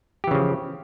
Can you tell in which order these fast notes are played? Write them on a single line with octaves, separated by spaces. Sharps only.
G4 E3 C#3 F3